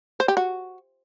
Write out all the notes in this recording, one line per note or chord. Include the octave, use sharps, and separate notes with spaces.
C5
G4
F#4